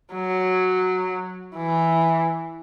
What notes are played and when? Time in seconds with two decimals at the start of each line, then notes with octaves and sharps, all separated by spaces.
0.14 F#3
1.56 E3